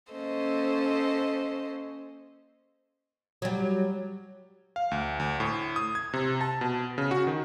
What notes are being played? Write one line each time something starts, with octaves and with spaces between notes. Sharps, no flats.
A#3 C#4 A4 C5 D#5
F#3 G3
F5
D2
D2
A2
D#6
G#6
C3
A5
B2
C#3
F#4
D#3